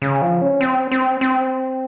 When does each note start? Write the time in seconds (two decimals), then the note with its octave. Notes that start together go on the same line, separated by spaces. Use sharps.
0.02 C#3
0.22 F3
0.42 C#4
0.61 C4
0.91 C4
1.21 C4